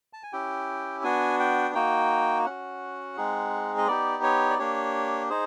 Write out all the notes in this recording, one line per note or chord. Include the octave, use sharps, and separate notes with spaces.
A5
G#5
C#4 E4 G4 G5
B3 D4 F#4 G#5
G5
A#3 D#4 F#4 G5
C#4 F#4 F#5
G#3 C4 D#4 G#4
D#5
B3 D#4 G4 D5
C#5
D5
A#3 D4 G4 C#5
D#4 G#4 C5